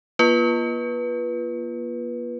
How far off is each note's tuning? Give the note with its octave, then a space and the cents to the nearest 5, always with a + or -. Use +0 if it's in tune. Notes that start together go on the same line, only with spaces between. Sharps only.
A#3 +40 F4 -20 B4 -15